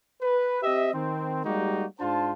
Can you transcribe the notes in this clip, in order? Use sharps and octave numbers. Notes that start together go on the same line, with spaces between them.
B4
C4 G4 D#5 E5
D#3 C4
G3 G#3 A#3 D#4 F#4 G4
G#2 D4 F4 C5 A5